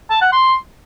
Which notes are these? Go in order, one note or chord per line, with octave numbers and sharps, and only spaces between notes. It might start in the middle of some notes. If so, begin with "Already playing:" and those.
A5
F#5
C6